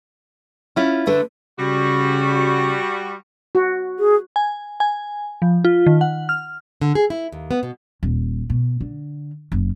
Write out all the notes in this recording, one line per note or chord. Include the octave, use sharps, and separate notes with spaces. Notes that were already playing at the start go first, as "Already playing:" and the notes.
C#4 E4 F4
D3 A3 B4
C#3 G3 F#4
F#4
G#4
G#5
G#5
F3
F4
D#3
F#5
F6
D3
G#4
E4
D#2
B3
B2
D#1
B2
D3
F#1